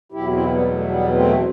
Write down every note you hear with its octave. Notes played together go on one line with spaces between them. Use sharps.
E2 B2 F#3 E4 G4
C4 E4
G3 B3
A3
G3 B3
A3 C4